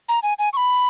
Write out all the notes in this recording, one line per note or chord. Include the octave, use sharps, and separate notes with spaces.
A#5
G#5
G#5
C#6
B5